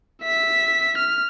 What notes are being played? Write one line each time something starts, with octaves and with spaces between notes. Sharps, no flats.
E5 B6
F6